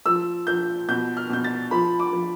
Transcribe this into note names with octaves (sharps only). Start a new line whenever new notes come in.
F3 E6
F3 G6
B2 G6
F6
B2 G6
A6
F3 B5
D6
F3